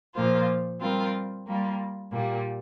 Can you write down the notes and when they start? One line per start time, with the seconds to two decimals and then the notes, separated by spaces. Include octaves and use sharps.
0.15 A#2 F3 A#3 F4 C5
0.80 G3 C4 F4 A#4
1.46 G3 A#3 F4
2.11 A#2 G3 A#3